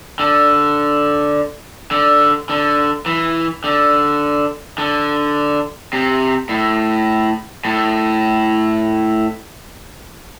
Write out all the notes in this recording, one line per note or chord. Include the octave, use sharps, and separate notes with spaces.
D3
D3
D3
E3
D3
D3
C3
A2
A2